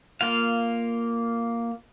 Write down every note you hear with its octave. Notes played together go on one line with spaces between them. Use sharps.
A#3 F4 F5